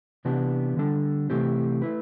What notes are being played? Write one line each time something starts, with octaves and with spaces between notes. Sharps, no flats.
C3 E3 B3 D4 G4
D3 G3 D4 A4
C3 E3 A3 C4 G4
A3 E4 B4